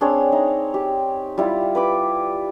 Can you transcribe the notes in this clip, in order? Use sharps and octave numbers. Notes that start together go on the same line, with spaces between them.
C4 D4 G#4 C#5
D#4
G4
G3 E4 F4
B4 B5 D6